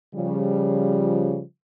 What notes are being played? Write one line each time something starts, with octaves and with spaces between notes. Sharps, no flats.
C#3 F3 G3